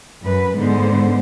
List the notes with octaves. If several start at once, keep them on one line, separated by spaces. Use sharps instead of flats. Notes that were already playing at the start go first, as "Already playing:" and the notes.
F#2 B4
G#2 D3 B3 C5